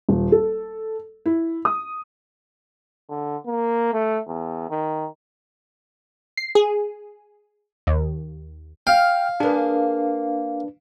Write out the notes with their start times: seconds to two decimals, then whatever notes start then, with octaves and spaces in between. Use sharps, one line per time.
0.09 D#1
0.32 A4
1.26 E4
1.65 D#6
3.09 D3
3.46 A#3
3.93 A3
4.27 E2
4.70 D#3
6.37 C7
6.55 G#4
7.87 D#2
8.87 F5 G5 F6
9.40 A#3 D4 G#4 B4